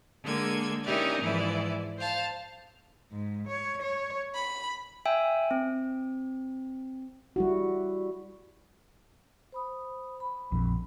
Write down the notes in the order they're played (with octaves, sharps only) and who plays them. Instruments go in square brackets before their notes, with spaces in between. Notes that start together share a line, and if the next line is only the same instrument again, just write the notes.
[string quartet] D3 G#3 A#3 A4 G#6
C#4 D#4 E4 G4 A#4 D5
G#2 E3 F3 E4 D5
C5 F5 A5
G#2
C#5
C#5
B5
[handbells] E5 G5 G#5 E6
C4
[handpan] G3 E4 F#4
[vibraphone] C5 B5 D#6
B5
[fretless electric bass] A#1 F2